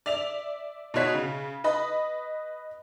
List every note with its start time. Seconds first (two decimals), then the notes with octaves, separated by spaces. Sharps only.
0.06 D5 E5 F7
0.94 B2 D#4 F#4 C#5 B6
1.14 C#3
1.64 B4 D#5 B5